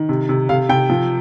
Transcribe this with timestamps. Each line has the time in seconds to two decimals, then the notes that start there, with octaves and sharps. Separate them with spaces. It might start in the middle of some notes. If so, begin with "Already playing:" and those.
Already playing: D#3
0.09 C3
0.29 C3
0.49 C3 F5
0.69 C3 G5
0.90 F3